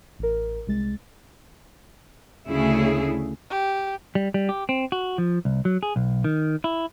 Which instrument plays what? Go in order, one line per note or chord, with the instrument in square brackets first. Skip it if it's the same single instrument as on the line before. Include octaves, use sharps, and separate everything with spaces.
[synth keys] A1 A#4
C2 G#3 A6
[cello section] D2 C#3 A3 E4 G#4
[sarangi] G4
[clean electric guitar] G3
G3
G4
C4
F#4
F3
C2
F#3
G#4
B1
D#3
E4